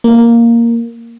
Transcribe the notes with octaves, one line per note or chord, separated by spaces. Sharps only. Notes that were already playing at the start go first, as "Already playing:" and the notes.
A#3